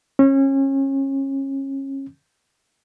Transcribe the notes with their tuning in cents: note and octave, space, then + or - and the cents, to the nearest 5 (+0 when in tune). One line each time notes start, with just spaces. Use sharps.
C#4 -30